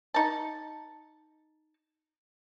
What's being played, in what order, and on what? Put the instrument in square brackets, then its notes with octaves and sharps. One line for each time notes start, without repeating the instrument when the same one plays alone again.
[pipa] D#4 A5